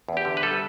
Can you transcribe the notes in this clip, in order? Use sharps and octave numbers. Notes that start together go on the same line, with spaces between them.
E2
G4
D3
B4
G3 A4